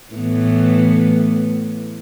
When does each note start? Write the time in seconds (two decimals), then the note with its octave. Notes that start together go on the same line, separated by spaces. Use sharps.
0.14 A2 E3 B3